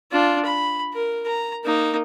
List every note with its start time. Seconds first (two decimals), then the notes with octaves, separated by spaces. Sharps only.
0.12 D4 F4
0.45 B5
0.93 A#4
1.27 A#5
1.64 A#3 D#4